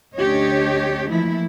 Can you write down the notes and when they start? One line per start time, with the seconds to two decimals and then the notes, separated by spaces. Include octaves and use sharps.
0.16 D2 C#4 D4 G4 C#5 D#5
1.09 E3 F3 A3 A#3 E4